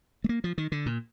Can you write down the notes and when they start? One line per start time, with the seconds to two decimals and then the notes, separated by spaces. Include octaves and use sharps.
0.24 A3
0.29 A#3
0.44 F3
0.58 D#3
0.72 D3
0.86 A#2